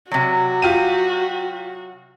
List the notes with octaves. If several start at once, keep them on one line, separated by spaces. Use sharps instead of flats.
C3 F#3 F#4
F4 G4 D#7